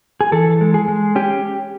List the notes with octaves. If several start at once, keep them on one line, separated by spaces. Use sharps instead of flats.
G#4
E3 A4
G#3
G#4
G#3
C#4 G4